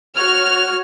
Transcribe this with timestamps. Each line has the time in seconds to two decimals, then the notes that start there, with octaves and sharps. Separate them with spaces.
0.16 F#4 C#5 F6